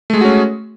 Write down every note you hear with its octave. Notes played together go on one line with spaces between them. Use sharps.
G#3 A3 C#4 F#4 G#4